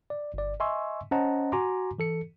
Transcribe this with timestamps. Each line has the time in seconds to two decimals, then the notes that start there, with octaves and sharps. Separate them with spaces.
0.10 D5
0.34 G1 D5
0.60 D#5 E5 G#5 C6 C#6 E6
1.11 C#4 C5 D#5 F#5 A5 A#5
1.52 F#4 G#5 A#5 C6 D6
1.98 E3 A4 C#7